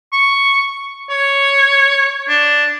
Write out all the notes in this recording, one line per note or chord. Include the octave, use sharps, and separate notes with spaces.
C#6
C#5
D4